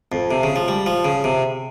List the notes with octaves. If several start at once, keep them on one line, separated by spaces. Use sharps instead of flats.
F2
C3
C#3
F3
G3
F3
C#3
C3